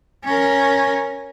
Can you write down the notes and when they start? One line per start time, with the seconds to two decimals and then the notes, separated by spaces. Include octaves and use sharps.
0.24 C#4 A#4